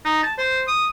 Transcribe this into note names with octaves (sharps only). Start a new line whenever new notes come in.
D#4
A5
C5
D#6